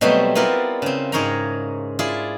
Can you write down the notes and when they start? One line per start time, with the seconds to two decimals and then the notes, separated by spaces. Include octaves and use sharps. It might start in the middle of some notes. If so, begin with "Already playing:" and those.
0.01 B2 F#3 G3 A3 B3 C4
0.35 B3 C4 E4 F4 A#4 D5
0.82 C#3 C4
1.12 G#2 G#4 A#4 C#5 G5 A#5
1.99 E4 F4 G#4 D5